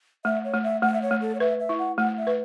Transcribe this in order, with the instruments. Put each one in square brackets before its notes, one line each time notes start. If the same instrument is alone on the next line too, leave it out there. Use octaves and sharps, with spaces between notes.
[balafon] A3 [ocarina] E5
[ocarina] C#5
[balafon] A3
[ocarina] E5
[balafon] A3 [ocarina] F#5
[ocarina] E5
C#5
[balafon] A3
[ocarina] A4
C#5
[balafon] B4 [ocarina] E5
[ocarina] E5
[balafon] E4
[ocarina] F#5
[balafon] A3 [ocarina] F#5
[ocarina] E5
[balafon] B4